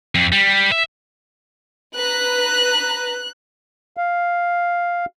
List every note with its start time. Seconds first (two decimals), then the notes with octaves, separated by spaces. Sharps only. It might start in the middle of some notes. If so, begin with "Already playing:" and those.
0.15 F2
0.32 G3
0.72 E5
1.95 B4 A#5 F#6
3.97 F5